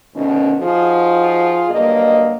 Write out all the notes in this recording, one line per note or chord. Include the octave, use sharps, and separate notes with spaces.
D2 B2 D#3 C#4
F3 D#4 F4 F#4 G#4
G2 F#3 A#3 D#5